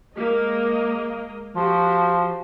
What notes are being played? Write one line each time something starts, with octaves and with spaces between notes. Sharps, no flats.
G#3 A#3 D#5
F3 F#4 G4 C5